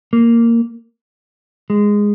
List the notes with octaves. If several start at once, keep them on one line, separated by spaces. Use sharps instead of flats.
A#3
G#3